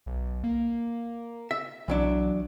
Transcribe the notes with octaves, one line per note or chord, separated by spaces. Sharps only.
B1
A#3
E5
B1 E3 F#3 D4